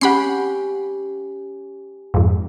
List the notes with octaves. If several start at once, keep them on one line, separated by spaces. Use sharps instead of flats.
C#4 G4 F#5 B5 C7
F2 G#2